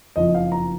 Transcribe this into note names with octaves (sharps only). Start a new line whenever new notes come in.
F#1 F2 F3 D#5
F5
A#5